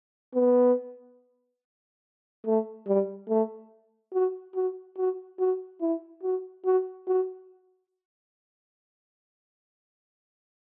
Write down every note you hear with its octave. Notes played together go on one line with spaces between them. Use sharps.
B3
A3
G3
A3
F#4
F#4
F#4
F#4
E4
F#4
F#4
F#4